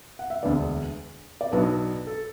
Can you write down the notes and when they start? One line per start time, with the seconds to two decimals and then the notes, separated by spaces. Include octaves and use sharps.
0.19 F#5
0.30 E5
0.43 E1 D2 D3 B3 D5
1.41 D5
1.52 B1 B2 F#3 B3 D4 B4
2.07 A4